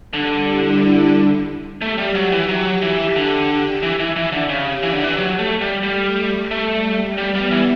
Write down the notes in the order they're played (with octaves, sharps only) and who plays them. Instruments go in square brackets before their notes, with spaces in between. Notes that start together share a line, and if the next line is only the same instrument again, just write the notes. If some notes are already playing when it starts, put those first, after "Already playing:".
[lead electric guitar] D3 [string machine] G3
[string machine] E4
[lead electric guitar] A3 [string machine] G4
[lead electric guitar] G3
F#3
E3
F#3
E3
D3
E3
E3
E3
D3
[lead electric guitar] C#3 [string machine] G4
[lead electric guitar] E3
D3
E3
F#3
A3
G3
[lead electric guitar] G3 [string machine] A3
[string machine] G3 [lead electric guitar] A3
[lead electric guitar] G3 [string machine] B3
[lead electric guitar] G3
E3